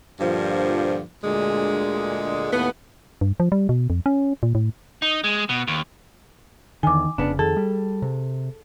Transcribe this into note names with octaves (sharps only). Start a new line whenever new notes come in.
G2 A#2 D3 F3
D2 A#2 D3 G#3
D#2 A2 B3
G2
F3
G3
B2
F2
C#4
A#2
A2
D#4
G#3
B2
D#2
E2 D3 D#3 G#5 D6
F1 C#3 B3 D4
F2 D#3 G#4 A4
G3
C3